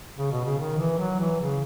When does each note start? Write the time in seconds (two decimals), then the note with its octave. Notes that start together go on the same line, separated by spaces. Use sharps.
0.18 C#3
0.31 B2
0.45 C#3
0.59 D#3
0.78 E3
0.98 F#3
1.19 E3
1.40 C#3